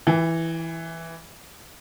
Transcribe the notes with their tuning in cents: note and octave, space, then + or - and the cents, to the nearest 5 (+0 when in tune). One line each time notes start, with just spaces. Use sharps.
E3 +0 E4 +0 G5 +40